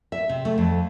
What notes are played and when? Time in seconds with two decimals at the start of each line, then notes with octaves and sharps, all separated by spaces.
0.12 E5
0.29 C3
0.45 A3
0.58 F2